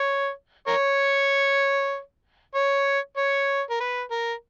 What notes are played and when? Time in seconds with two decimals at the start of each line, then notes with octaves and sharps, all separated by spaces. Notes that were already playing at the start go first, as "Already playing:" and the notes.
Already playing: C#5
0.67 A#4 C#5
2.55 C#5
3.17 C#5
3.70 A#4
3.80 B4
4.11 A#4